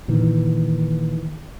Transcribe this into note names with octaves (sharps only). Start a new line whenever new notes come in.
A#2 D#3 E3